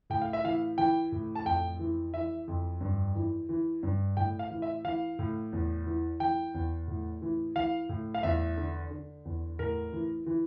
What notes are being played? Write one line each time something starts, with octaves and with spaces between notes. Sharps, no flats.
A2 G5
F5
E5
E3 F5
E3 G5
A2
A5
F2 G5
E3
E3 E5
F2
G2
E3
E3
G2
A2 G5
F5
E3
E5
E3 F5
A2
E2
E3
E3 G5
E2
A2
E3
E3 F5
A2
F5
E2 E5
D3
D3
E2
A2 A#4
E3
E3